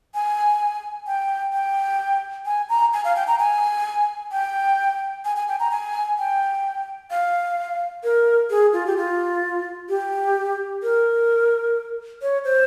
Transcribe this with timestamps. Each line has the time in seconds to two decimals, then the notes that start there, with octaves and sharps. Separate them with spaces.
0.14 G#5
1.07 G5
1.53 G5
2.46 G#5
2.69 A#5
2.93 G#5
3.05 F5
3.16 G5
3.27 A#5
3.39 G#5
4.32 G5
5.25 G#5
5.36 G#5
5.48 G5
5.60 A#5
5.71 G#5
6.18 G5
7.11 F5
8.04 A#4
8.50 G#4
8.73 F4
8.86 G4
8.97 F4
9.89 G4
10.83 A#4
12.22 C#5
12.45 C5